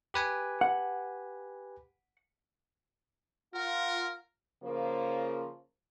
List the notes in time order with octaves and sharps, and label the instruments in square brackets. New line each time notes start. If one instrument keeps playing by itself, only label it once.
[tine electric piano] G4 B4 G#5
[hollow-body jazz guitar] F#5
[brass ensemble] F4 [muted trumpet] A#4 [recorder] F#5
[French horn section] C#3 F3 A#3